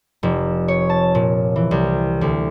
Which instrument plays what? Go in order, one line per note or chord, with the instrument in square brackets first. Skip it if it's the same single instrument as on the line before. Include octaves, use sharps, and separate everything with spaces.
[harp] F1
C#5
A5
A#2
E3
C2
D2